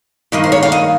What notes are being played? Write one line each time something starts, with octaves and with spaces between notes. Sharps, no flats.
G2 D#3 A#3 D#5
C5
C#5
F5
D#5